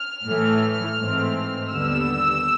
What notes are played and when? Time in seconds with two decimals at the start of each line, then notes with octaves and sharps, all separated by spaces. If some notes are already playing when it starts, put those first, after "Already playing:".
Already playing: F6
0.27 A2 E3 A3
1.00 G#2 E3 A3 C4
1.72 D#2 D3 G3 B3 E6